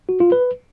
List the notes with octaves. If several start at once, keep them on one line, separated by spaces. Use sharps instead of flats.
F#4
F4
B4